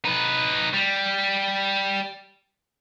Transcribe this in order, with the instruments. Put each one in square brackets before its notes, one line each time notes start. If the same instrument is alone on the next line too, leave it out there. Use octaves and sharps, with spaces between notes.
[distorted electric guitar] D#4 B4
G3